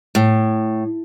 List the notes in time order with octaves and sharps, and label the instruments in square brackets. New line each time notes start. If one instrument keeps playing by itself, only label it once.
[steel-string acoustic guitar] A2